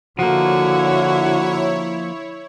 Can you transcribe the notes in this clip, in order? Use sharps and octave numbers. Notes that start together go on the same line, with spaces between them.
D3 F3 A#3 E4 F#4 C#5